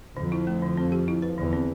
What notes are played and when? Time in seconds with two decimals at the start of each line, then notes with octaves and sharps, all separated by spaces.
0.17 F2 D3 F3
0.32 E4
0.47 A3
0.62 D3
0.77 C4
0.92 G4
1.08 E4
1.22 B4
1.38 E2 D3 E3
1.53 C4